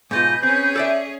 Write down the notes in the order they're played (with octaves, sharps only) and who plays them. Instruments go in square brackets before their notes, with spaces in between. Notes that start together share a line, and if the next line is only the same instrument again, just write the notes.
[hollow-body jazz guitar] G#2 B2 F4 [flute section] B4 G#5 G6 [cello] D#5
[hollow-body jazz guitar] C4 [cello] C#4 G#4
[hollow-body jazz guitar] A4 D5 E5